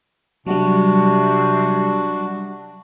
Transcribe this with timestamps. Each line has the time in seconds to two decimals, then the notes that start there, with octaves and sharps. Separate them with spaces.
0.47 C3 F#3 G3 D4 F#4